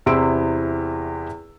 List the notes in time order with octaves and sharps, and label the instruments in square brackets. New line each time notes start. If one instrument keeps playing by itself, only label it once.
[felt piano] E2 C3 E4 C6 E6 D7